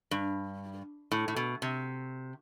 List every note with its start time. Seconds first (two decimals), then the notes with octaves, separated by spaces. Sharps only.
0.11 G2
1.12 A2
1.28 A2
1.36 B2
1.62 C3